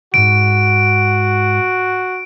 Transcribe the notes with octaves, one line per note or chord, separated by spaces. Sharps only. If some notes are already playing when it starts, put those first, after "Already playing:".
C2 G#2 F#4 D7